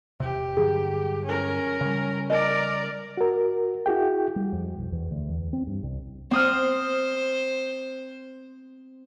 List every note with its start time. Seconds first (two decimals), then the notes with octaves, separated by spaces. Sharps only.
0.20 E1 C3 G4
0.57 G2 D3 F#3 G#4
1.24 C#4 A#4
1.81 C#3 G3
2.30 A#4 D5 D#5
3.17 F#4 A#4
3.86 E4 F#4 G#4 G5
4.36 G3
4.52 F2
4.78 B1
4.92 E2
5.11 D2
5.29 E2
5.53 C4
5.67 G2
5.83 C2
6.31 C4 C5 D#6 F6